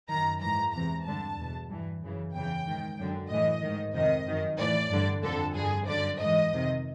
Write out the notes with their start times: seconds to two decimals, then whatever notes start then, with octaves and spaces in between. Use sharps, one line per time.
0.09 F#2 D#3 A#5
0.41 G#2 E3 A#5
0.73 E2 C3 E3 A#5
1.05 G2 D3 A5
1.37 E2 B2
1.69 G2 E3
2.01 F#2 C#3 E3
2.33 E2 C#3 E3 G5
2.66 G#2 D#3
2.98 F#2 D3
3.30 A2 E3 D#5
3.62 G#2 D#3
3.94 F2 C3 D#3 D#5
4.27 F#2 D#3
4.58 A2 E3 D5
4.91 G2 D3
5.22 F2 D3 A4
5.55 G2 D3 G#4
5.87 F#2 D3 D5
6.19 G#2 E3 D#5
6.51 F2 C3 D#3